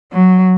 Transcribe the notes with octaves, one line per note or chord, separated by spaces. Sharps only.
F#3